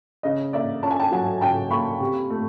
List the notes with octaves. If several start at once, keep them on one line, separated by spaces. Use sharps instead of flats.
C#3 D#5
A#3 D5 E5
C#4 A5
G#5
G5 A5
F#3 F#5 G#5
C#3 G5 A5
A#3 B5 C#6
C3
A3